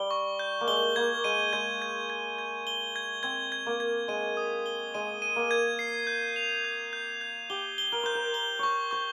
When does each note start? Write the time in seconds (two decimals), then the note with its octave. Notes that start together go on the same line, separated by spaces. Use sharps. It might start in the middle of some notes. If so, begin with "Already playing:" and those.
Already playing: G3 G7
0.11 C#6
0.39 G6
0.61 A#3
0.67 G#3 G7
0.96 A#3 G#6
1.24 G#3 D#7
1.53 G#3 G#6
1.82 G#6
2.10 G#6
2.38 G#6
2.67 G7
2.96 G#6
3.23 C4 G#6
3.52 G#6
3.66 A#3
3.80 G#6
4.08 G#3 D#7
4.37 D#6
4.66 G7
4.94 G#3 D#7
5.22 D#7
5.36 A#3
5.51 G#6
5.79 C7
6.07 G6
6.36 F7
6.65 G6
6.93 G6
7.21 G6
7.50 G4 G7
7.78 G7
7.92 A#4
8.03 C5 G6
8.15 A#4
8.34 G7
8.59 C5 C#5 C#6
8.91 C5 C#6